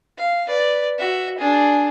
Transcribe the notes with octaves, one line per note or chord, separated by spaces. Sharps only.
F5
B4 D5
F#4 E5
D4 G#4